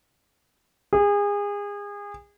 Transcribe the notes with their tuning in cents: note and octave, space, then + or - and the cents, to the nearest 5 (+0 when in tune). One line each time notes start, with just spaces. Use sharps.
G#4 -30